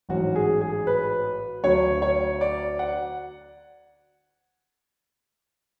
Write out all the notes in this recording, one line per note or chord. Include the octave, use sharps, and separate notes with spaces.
A1 G#2 F#3 C#4 F#4
G#4
G#4
B4
D2 D3 F#3 C#5
C#5
D5
F#5